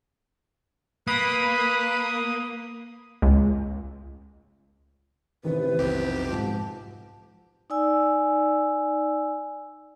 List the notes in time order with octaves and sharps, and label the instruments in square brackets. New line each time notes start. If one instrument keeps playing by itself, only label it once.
[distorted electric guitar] A#3 [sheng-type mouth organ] B4 B5 [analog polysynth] D#6
[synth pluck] C#2
[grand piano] A1 D#3 [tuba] C3 [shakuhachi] B4
[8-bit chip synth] B1 F2 G4
[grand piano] G#2 F3 [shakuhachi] A5
[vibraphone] D#4 D5 G#5 E6